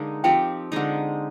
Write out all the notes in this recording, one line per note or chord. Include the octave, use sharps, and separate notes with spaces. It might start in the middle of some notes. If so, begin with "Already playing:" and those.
Already playing: D3 G#3 A#3 D#4
F3 C4 G4 G5
D3 G#3 D#4